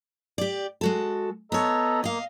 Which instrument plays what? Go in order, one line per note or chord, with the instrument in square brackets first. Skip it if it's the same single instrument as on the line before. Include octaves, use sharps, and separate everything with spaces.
[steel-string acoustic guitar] G4 D5
G#3 F#4 A4
[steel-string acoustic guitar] B3 C#5 [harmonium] A4 D#5 A#5
[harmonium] A#3 [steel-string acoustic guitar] D#5 F5